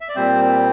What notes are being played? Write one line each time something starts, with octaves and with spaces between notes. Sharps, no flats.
E5
D5
A#2 G3 C4 C5